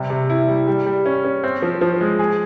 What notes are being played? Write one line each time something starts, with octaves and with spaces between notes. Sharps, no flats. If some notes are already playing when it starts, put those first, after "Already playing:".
Already playing: C3 G3
C3
E4
G3
G3
G3
C#4
C#4
C4
F3
F3
G#3
G#4